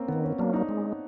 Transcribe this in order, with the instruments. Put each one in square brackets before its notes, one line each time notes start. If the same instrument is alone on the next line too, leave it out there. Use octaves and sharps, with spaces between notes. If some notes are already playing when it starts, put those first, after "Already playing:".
Already playing: [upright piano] A#3 C4 C#4
[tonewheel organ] D#3 [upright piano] B3
[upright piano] C#4
[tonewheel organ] F#3 A#3 [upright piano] D4
[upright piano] D#4
[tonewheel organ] G#3